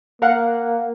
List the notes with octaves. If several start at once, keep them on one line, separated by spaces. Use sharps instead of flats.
A#3 A#4 F5 F#5